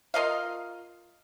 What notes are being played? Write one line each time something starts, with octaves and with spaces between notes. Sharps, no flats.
F4 A#4 D#5 F5